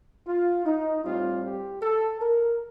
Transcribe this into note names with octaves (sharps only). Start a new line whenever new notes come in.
F4
D#4
A2 G3 C4 F4
G4
A4
A#4